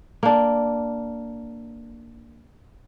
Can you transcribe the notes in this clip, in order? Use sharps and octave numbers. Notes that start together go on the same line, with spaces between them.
A#3 D4